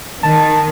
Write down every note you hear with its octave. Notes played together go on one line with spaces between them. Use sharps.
D#3 A5